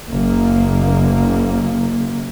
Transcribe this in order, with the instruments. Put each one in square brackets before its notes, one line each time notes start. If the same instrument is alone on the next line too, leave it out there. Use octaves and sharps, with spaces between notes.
[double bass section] F#1 A#3